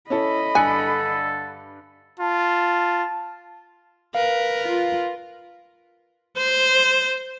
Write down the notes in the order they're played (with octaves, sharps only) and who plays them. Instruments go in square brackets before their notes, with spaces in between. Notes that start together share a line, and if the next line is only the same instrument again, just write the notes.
[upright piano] C#4 E4 A4 [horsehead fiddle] D#5 B5
[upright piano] G2 F#6 C#7 [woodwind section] D3 A4 [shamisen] G#5
[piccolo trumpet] F4 [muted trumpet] A5
[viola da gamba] A#4 B4 [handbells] F5
[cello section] F4
[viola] C5